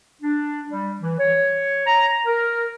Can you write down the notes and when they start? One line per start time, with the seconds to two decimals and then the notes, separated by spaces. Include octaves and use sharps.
0.22 D4
0.69 G3
1.01 E3
1.17 C#5
1.86 A#5
2.25 A#4